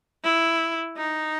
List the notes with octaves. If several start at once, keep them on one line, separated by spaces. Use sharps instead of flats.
E4
D#4